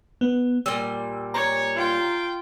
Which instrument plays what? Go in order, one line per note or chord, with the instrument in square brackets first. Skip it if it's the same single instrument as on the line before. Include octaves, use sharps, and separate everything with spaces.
[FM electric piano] B3
[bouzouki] A#2 G3 [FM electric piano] E6
[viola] C#5 [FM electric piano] A#5
[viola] F4 G5